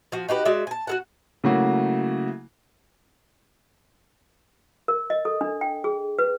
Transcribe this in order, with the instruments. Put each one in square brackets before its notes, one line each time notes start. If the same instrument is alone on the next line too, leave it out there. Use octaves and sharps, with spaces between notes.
[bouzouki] F3 F#4
D#4 F#4 G4 B4
G#3 F#4 D5 E5
G#5 A5
F#4 A4 F#5
[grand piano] C#3 F#3 A3 A#3 E4 F#4
[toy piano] A#4
D#5
A4
D4
G5
G#4
B4